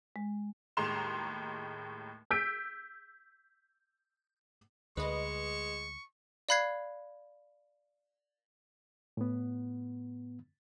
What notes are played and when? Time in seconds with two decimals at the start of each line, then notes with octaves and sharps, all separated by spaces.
0.16 G#3
0.77 D#2 A2 G#3 A#5 C6 E7
2.31 E6 G6 B6 D7
4.97 D2 G#3 B4 D#5 C#6
6.49 D5 F5 B5 F#6 G#6 C7
9.17 A2 B3